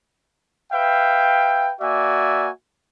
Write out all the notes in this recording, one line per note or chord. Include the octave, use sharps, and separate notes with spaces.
B4 E5 F5 G5
A#3 F#4 D5 E5 G#5